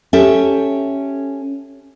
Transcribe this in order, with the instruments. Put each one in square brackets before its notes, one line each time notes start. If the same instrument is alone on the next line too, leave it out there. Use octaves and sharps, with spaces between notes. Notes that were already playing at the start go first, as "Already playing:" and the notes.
[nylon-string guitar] C#4 G4 A4 E5